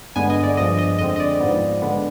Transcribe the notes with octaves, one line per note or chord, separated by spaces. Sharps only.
G2 D3 G#3 B3 G#5
D#5
D5
G2 F3 G#3 D#5
D#5
F2 D3 G#3 C4 D#5
D#5
D5
G#2 F3 B3
D3 G#3 B3